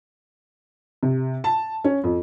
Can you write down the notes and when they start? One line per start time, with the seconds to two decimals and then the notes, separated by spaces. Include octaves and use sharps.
1.03 C3
1.44 A5
1.84 C#4
2.04 F2